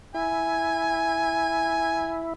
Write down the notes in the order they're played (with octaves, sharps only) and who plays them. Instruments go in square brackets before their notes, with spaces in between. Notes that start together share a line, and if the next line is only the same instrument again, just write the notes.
[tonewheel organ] E4 [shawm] G#5